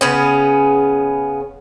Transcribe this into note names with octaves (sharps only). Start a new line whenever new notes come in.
C#3 B3 C#4